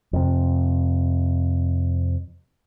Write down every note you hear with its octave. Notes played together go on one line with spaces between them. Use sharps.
F2 C3